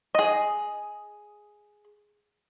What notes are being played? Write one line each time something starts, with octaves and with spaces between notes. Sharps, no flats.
G#4 D#5